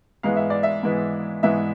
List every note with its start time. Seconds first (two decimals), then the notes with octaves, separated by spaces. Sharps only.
0.23 G#2 E3 G#3 B3 F5
0.36 E5
0.50 D5
0.63 E5
0.83 G#2 E3 G#3 B3
1.43 G#2 E3 G#3 B3 E5